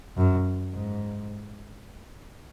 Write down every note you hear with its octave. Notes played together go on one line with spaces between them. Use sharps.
F#2
G#2